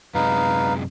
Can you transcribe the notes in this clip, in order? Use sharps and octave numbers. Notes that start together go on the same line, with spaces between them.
F#2 C3 G#3 D#4 B4 F5